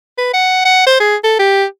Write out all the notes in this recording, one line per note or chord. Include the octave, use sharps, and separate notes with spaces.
B4
F#5
F#5
C5
G#4
A4
G4